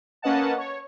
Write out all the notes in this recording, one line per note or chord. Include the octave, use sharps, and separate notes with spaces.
A#3 C#4 B4 D#5 F#5 A5
C#5